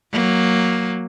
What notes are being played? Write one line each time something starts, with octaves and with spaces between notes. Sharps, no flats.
F#3 A#3